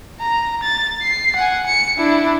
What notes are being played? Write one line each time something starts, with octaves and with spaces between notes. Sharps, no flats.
A#5
A6
C7
F#5 G#5
C#7
D4 E4